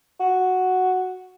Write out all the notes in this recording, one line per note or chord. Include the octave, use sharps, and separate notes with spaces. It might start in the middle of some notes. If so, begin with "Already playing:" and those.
F#4